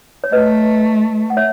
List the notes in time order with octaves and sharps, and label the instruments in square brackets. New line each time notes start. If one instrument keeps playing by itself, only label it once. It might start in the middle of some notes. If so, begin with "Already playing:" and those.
[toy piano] C#5
[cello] A3 [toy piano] B4 D#5
[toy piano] F#5
C#5 E5